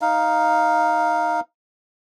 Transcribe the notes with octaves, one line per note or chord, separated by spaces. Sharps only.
D#4 F5